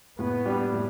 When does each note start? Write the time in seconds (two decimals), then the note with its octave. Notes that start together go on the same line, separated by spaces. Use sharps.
0.19 A2 B3
0.45 G3 D4 G4
0.73 A2